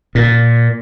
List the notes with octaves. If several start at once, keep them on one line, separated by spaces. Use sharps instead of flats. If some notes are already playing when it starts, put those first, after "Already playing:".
A#2